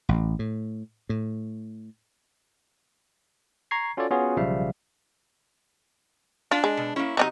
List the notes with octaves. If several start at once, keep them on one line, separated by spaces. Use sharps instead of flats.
A1
A2
A2
A#5 C#6 G#6 C7
C#4 F4 F#4 A4 C#5 D5
B3 C#4 F4 F#4 G#4 C#5
B1 C#3 F3 G3 E5 F5
D4 F4
G#3
B2
A#3 C#4 E4
C3 F#3 D4 D#4 F#4 D#5